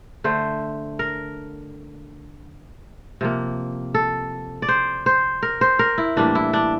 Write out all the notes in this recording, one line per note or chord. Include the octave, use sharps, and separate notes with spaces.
D3 A3 C5
A#4
C3 F3 A#3
A4
D5
C5
C5
A#4
C5
A#4
E4
A2 E3 G3 A#3 D4
E4
D4